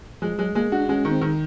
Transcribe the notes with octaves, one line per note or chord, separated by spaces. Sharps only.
F3 G#3
F#3 G#3
G#3 A#3
D4 F#4
G#3 C#4
D#3
C4
D#3